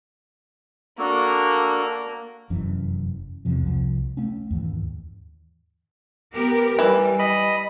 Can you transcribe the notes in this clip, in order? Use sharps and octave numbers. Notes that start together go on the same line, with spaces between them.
A#3 D4 F#4 A4
F1 F#2 E3 C#4
E2 C3 F3
C2 F3
A3 C#4
D#2 G#2 E3
B3 G4 A#4
E3 G3
D#5 B5